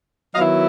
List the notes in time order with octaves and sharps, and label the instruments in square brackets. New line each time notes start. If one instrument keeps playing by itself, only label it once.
[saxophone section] D#3 F#3 B3 E4 D#5 F5